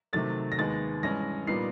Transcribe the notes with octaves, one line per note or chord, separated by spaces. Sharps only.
C3 D#3 F#3 A3 A6
A#6
D#2 D#3 G#3 B3 A6
G2 E3 G#3 C#4 A#6
A#2 G3 B3 D#4 C7